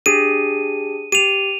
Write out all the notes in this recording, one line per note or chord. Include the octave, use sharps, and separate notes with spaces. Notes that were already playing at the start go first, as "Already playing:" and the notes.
D4 G4 G#4 D#7
G4 D#7 F7